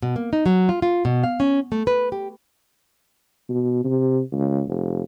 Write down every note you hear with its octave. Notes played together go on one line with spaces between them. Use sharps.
B2
A#3
D#4
F#3
F4
F4
B2
F5
C#4
A3
B4
G4
B2
C3
C#2
F1